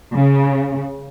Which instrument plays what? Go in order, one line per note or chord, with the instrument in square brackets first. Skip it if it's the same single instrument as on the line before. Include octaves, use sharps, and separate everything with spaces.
[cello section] C#3